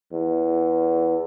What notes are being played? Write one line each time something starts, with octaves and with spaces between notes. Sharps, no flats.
E2